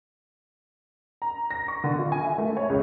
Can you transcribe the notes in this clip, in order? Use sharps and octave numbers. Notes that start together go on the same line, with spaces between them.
A#5
A#6
C#6
D3
F4
G#5
E5
A3
C#5
C#2